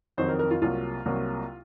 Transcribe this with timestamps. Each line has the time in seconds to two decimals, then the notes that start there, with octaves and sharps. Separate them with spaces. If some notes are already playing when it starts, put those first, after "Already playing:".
0.18 F2 D#3 F#3 C4 C5
0.29 A#4
0.39 A#4
0.51 F4
0.62 C2 C3 F#3 A#3 F4
1.06 C2 C3 F#3 A#3